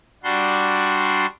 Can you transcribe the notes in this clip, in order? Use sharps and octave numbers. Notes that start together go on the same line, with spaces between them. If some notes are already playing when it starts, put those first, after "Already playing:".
G3 D4 F#4 C6